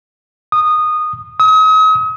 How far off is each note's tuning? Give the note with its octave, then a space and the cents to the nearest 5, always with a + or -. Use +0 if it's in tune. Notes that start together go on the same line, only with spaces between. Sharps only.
D#6 -15
D#6 +40